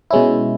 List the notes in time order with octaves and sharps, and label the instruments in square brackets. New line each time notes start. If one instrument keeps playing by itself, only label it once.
[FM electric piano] B2 G#3 C#4 E4